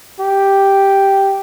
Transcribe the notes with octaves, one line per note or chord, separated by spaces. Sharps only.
G4